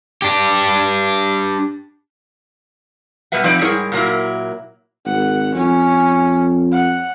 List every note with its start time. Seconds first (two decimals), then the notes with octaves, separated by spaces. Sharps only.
0.22 D4 G4
3.32 B2 G3 B4 E5 F#5
3.44 F3 C4 D#4 B4 D5
3.61 G#2 G3 E4 G#4 A#4 C#5
3.92 A#2 F#3 A#3 E4
5.05 G#1 F#5
5.55 F2 C#4
6.72 F#5